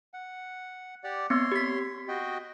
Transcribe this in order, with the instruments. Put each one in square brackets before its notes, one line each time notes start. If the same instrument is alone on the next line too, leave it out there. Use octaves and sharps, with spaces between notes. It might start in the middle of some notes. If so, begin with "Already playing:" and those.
[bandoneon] F#5
G4 D5 F#5
[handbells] B3 C4 [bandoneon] C#5 C6
[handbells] G4 B6
[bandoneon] F#4 D#5 G5